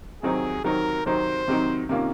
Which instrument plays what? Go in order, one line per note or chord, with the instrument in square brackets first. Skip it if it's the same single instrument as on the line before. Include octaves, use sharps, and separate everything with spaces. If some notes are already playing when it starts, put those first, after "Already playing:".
[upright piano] C3 D#3 F#3 C4 D#4 [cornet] G#4
[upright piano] C3 D#3 F#3 C4 D#4 [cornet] A#4
[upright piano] C3 D#3 F#3 C4 D#4 [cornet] C5
[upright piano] C3 D#3 F#3 C4 D#4
C3 D#3 A#3 C#4 F4